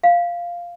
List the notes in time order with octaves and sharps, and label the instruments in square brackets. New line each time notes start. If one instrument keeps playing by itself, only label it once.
[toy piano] F5